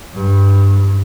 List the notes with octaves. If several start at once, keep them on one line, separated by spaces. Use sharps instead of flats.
G2